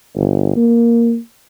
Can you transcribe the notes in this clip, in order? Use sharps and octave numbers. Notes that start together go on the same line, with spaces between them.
G1
A#3